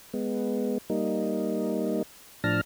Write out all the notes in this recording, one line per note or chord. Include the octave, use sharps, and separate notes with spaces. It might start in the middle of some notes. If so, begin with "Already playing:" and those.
G#3 B3
G3 A#3 D#4
A2 F3 D4 A5 F6 A#6